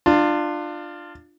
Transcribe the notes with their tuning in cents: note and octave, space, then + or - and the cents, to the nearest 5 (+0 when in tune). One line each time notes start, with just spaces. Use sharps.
D4 +25 F4 +0